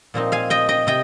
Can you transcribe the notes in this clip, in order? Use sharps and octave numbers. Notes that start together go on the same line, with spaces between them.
A#2 F3 C4 D#4
F5 G#5
D#5 G5
D#5 G5
C3 D#5 G5